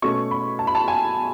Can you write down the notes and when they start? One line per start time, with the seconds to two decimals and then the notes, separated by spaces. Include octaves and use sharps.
0.02 B2 A3 C#4 C#6
0.31 B5
0.59 A5
0.67 B5
0.75 A5
0.88 G#5